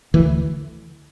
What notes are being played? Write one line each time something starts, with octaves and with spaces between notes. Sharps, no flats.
D2 E3